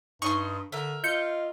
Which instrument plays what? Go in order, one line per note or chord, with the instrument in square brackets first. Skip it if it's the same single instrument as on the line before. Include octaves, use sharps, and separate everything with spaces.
[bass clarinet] G2 [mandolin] D#4 D#5 C6 [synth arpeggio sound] C#6
[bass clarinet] D3 [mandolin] A#4 E5
[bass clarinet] F4 [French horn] D#5 [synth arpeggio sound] G6 C#7